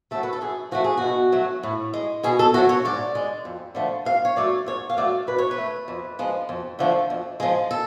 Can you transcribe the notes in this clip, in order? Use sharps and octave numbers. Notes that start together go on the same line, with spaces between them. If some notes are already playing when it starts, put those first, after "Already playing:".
F#3 A3 A4
B4
A4
F#2 G#4
F3 A3 F#4
G#4
B2 F#4
F#3 A3
A2
G#3
B2 G#4
A4
F#3 A3 F#4
C#5
G#2 D5
G#3
F2
D3 F3 A3
G#2 F5
C#5
F#3 A3 D5
G#2 C#5
F5
F#3 A3 D5
B2 B4
C#5
B4
A3
F2
F3 G#3
F2
D3 F3 A3
F2
F3 G#3
A4